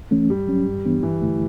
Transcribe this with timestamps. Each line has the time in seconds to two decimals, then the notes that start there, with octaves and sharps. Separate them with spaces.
0.11 E3 A3 C#4
0.29 G2 G3
0.47 F#3 C#4
0.66 G2
0.85 E3 B3 D4
1.03 G2 E3
1.21 D3 A3 E4